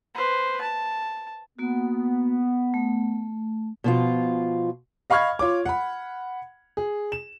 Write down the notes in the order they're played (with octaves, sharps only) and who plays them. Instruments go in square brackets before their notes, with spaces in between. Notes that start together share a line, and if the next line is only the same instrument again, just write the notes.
[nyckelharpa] B4 C5
A5
[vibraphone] A#3 F#4 [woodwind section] B3
[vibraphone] A3
[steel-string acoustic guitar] B2 F3 F4
[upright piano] D#5 F5 B5 C#6 F6 G#6
F4 C#5 D6
F#5 B5
G#4
E7